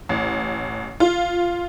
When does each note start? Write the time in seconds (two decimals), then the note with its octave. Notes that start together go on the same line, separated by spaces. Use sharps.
0.09 A1
1.00 F4